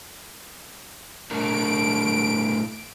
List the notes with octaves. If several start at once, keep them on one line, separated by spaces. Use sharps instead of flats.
A2 D4 A#4 D7